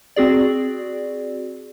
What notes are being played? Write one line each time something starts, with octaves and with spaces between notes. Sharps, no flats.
C4 F#4 G#4 D5